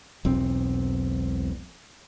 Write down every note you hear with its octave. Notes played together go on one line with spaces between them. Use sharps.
E1 B1 C4